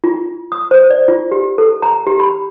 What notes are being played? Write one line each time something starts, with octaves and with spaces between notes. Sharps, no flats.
F4
D#6
C5
D5
F4
G4
A4
A#5
G4
B5